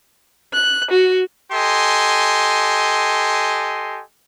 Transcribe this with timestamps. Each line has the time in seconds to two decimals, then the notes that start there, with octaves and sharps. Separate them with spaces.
0.53 F#6
0.90 F#4
1.52 G4 A4 D#5 G#5 C6